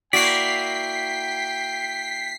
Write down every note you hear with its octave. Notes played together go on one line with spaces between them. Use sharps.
A#3 E4 F#4 D5 G5 B6 C7